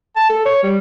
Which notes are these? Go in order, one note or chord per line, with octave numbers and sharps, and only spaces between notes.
A5
A4
C#5
G3